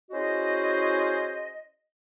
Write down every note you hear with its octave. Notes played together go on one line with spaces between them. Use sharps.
C#4 E4 F#4 G#4 C5 D#5